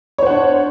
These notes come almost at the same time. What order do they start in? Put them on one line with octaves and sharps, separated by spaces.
C#5 C5 F#5 D4